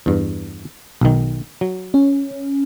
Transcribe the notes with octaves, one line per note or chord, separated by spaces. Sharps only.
E2 G2
B1 D#3
F#3
C#4